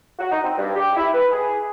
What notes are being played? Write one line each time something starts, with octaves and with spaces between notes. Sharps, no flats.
F#4
D#4
C4
G2
G4
E4
B4
G#4